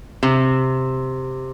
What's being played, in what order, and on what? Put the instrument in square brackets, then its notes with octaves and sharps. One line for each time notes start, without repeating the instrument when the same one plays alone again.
[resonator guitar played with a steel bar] C3